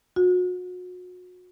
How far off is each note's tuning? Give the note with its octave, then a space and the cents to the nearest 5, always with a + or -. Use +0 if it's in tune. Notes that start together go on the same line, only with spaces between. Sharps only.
F#4 -35